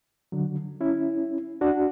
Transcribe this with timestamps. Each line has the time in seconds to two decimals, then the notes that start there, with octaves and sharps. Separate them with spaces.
0.32 D3 F#3
0.81 C#4 E4
1.61 D4 F#4